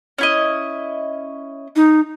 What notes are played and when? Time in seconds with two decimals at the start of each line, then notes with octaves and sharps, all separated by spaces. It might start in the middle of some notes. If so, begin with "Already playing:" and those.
0.18 C#4 E4 D#5
1.76 D#4